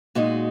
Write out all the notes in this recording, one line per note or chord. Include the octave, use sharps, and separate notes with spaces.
A#2 G#3 D#4 F#4